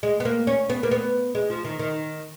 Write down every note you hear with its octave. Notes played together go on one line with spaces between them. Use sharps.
G#3
B3
A#3
C#4
B3
A#3
B3
G#3
F3
D#3
D#3